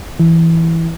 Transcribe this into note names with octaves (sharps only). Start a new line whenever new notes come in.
E3